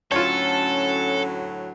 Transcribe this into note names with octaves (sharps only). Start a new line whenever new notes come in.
D2 A2 F#3 C#4 F4 A4 C#5